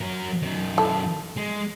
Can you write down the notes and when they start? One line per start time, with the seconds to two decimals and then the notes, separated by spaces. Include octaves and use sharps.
0.01 F#3 A#4
0.42 F#2 D#3
0.78 E4 A4
1.37 G#3